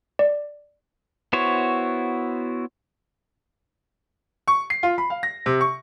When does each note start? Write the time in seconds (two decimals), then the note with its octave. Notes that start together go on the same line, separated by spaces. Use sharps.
0.19 D5
1.33 B3 E4 F#4 C5 C#5
4.48 C#6
4.70 C7
4.83 F4
4.98 B5
5.10 F5
5.23 A#6
5.46 C3
5.61 C#6